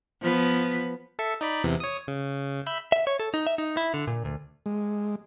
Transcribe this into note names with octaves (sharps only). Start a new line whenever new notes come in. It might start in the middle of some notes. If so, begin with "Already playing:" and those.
F3 B3 B4
A4 E5 C#7
D#4 D5 B5
E2 C3 E3
C#5 D#6
C#3
E5 B5 G6
E5
C#5
A4
D#4
E5
D#4
E4
D3
A#2
D2
G#3